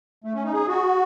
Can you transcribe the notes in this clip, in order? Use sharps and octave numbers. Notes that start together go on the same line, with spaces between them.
A3
C#4
D#4
G#4
F#4